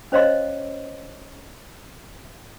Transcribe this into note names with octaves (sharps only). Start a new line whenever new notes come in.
C#4 C5 C#5 D#5 F5 C6